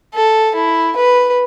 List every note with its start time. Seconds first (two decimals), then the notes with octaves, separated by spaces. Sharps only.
0.14 A4
0.55 E4
0.96 B4